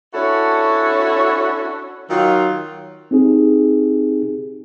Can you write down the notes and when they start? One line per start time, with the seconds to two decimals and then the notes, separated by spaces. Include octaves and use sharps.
0.14 C#4 D4 E4 F#4 A4 C#5
2.10 D#3 F#3 F4
3.11 C4 D#4 G4 G#4